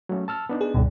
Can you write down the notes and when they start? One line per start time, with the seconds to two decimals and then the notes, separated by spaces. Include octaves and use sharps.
0.09 F#3 A3 C#4
0.28 A5 E6 F6
0.49 B3 D4 D#4
0.61 G#4
0.74 C#2 G2 B2